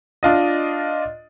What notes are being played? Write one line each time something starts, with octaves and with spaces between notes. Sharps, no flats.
D4 F4 D#5